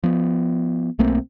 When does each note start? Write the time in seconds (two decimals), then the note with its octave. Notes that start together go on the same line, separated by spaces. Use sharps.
0.03 F3 B3
0.99 B1 A3 A#3 C4